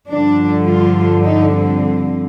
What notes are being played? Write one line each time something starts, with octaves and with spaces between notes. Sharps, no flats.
G2 D3 F3 D4
F4
D#4
C4